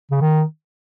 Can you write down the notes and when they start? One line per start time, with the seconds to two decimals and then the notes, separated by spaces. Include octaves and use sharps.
0.11 C#3
0.21 D#3